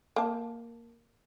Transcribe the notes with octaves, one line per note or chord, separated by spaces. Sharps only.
A#3 A5